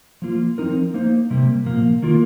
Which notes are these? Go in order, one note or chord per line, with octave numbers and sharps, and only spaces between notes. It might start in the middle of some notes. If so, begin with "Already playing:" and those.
F3 A#3 F4
F3 C4 D#4 A#4
A#3 D#4 C5
C3 G3 A#3
A#2 F3 A#3
D#3 A#3 F4 A#4